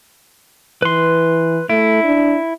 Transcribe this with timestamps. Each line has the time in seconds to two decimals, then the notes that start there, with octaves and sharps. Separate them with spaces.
0.82 E3 B4 C6
1.69 A3 E4
2.04 D4